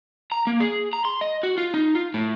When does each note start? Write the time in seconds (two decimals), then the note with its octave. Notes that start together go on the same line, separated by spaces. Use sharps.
0.32 A#5
0.47 A#3
0.60 G#4
0.93 A#5
1.05 C6
1.21 D#5
1.43 F#4
1.58 F4
1.74 D#4
1.95 F4
2.14 A2